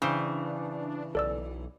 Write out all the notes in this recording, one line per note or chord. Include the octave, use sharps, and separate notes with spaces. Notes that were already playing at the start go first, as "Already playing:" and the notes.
C#3 E3 D4 C5 G5
B1 A4 D5 E6